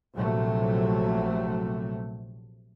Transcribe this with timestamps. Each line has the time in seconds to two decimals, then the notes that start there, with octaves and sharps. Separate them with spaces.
0.14 A#1 C3 F#3 A3